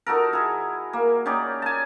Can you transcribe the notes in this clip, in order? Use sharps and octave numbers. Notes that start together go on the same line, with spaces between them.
D#4 F#4 A4 A#4
E4 G#4
A#3
C#4 D#4 G4 D5
G#5 A5